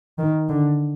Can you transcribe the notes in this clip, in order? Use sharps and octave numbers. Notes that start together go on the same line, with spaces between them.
D#3
D3